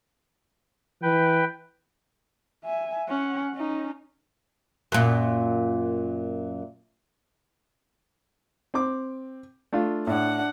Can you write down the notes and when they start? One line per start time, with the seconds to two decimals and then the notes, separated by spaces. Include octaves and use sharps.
1.02 E3 B4 G5
2.65 E5 G#5
3.09 C#4 F#5
3.54 C#4 D#4
4.92 F#2 A#2
8.74 C4 D6
9.73 A3 D4 F4
10.07 A2 D4 F#5